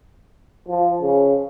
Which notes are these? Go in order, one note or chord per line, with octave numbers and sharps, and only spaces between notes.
F3
C#3